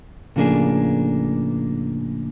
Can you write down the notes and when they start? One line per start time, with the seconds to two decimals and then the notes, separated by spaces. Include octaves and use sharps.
0.36 A2 C#3 F3 A#3 D4 G#4